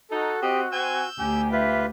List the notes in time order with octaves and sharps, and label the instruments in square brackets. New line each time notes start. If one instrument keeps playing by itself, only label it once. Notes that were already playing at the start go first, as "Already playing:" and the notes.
[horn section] D#4 [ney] F#4 [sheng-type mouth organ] A4
[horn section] C4 D#5 [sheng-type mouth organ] G4
[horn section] C4 G#5 [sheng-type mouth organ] E6 G6
[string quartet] D2 [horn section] G4 [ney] G#5
[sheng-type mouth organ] F4 B4 [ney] E5